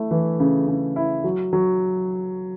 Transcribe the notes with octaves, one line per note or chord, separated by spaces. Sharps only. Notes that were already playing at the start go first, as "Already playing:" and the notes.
Already playing: A3 E4
E3
C#3
C#3
E4
F#3
F#3